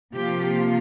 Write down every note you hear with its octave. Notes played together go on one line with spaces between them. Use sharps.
C3 F3 A#3 F4 G4